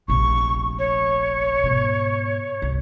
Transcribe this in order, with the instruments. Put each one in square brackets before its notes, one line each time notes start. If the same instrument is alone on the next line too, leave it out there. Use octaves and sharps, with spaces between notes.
[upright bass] F1 A#1 [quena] C#6
[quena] C#5
[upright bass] G#2 B2
C2